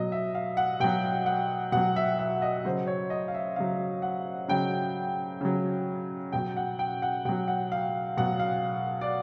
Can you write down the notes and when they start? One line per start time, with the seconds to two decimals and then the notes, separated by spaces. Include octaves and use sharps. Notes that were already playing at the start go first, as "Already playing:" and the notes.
Already playing: B2 F#3 D#5
0.12 E5
0.35 F5
0.57 F#5
0.80 B2 F#3 G5
1.26 F#5
1.72 B2 F#3 F#5
1.96 E5
2.19 E5
2.42 D#5
2.65 C#3 F#3 C5
2.87 C#5
3.10 D#5
3.28 F5
3.34 E5
3.56 C#3 F#3 F5
4.02 F#5
4.48 C#3 F#3 G5
5.41 C#3 F#3
6.32 B2 F#3 G5
6.57 F#5
6.79 G5
7.02 F#5
7.25 B2 F#3 G5
7.48 F#5
7.72 F5
8.17 B2 F#3 F#5
8.39 F5
9.01 D5